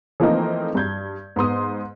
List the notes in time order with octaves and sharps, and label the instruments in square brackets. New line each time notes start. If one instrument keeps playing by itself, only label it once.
[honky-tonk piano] E3 F3 A3 A#3 C4 D#4
G2 G6 G#6
G#2 B3 C6 D#6